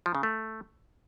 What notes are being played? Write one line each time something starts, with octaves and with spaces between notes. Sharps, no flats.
F3
C#3
A3